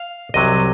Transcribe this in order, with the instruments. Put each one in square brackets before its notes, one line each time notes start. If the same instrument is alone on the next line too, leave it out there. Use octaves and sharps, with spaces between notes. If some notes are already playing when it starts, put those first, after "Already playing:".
Already playing: [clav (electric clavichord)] F5
C2 C3 F#3 D#5